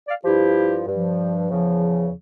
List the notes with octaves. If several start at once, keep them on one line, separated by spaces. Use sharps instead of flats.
D5 F5
G2 F3 E4 G4
G2 F3
E2 C#3 F3